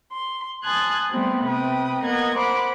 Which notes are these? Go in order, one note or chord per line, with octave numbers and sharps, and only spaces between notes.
C6
G#5 A5 C6 D#6 F#6 G#6
G3 A3 B3 C4
C3 B4 G5 D#6
A#3 B3 A#4 D#5 F#5 G#6
C5 F#5 B5 C6 D6